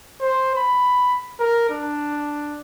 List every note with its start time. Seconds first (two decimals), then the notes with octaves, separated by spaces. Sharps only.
0.21 C5
0.56 B5
1.40 A#4
1.70 D4